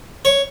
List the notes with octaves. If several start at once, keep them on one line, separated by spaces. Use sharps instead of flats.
C#5